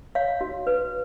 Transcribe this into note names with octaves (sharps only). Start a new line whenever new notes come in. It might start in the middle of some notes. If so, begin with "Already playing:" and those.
C#5 F5
F#4
B4